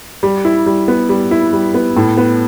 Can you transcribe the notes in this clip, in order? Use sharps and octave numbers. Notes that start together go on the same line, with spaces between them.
G3
E4
G3
B3
G3
E4
G3
B3
A2
B3